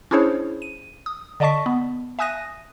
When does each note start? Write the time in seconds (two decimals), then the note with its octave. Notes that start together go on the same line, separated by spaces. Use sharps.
0.11 C#4 D4 E4 G#4 C5 C#5
0.62 D#7
1.06 D#6
1.40 D3 D5 D#5 A5 C#6 B6
1.66 B3
2.19 E5 G#5 D#6 F#6 A#6 D#7